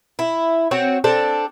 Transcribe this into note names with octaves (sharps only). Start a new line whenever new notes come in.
E4
C4 F#4 C#5
C4 D4 A4